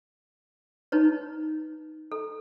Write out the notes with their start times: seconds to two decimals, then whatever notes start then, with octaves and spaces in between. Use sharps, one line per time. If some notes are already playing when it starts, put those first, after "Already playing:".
0.92 D#4 B4 C#5
2.12 A4